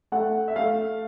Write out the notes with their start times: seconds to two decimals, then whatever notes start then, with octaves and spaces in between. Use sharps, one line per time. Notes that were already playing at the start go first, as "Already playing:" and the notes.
0.12 A3 F#5
0.48 E5
0.56 A3 F5